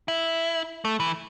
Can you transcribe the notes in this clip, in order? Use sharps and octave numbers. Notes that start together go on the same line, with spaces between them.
E4
A3
E3